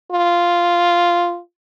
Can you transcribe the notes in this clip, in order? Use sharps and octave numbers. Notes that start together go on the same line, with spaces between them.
F4